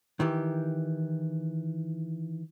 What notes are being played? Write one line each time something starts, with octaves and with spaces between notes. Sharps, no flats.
D#3 E3 G4